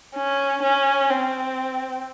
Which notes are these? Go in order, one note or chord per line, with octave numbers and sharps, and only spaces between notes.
C#4
C#4
C4